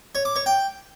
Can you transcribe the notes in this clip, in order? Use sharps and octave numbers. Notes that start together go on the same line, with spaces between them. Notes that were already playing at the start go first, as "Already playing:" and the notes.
C#5
D6
C#5
G5